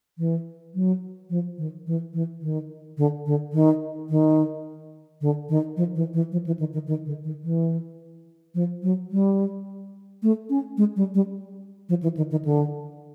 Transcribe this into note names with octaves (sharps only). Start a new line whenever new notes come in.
E3
F#3
F3
D#3
E3
E3
D#3
D3
D3
D#3
D#3
D3
D#3
F3
E3
E3
F3
E3
D#3
D#3
D#3
D3
D#3
E3
F3
F#3
G3
A3
C#4
G#3
G3
G3
F3
E3
D#3
D#3
D3